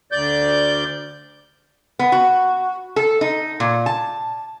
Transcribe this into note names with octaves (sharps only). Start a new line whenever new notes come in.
D2 D5 G6
B3
F#4
A4
D#4
A#2
A5